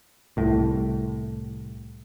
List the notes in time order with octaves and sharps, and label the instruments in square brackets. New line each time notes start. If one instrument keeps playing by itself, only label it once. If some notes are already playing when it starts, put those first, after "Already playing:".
[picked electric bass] C2 A2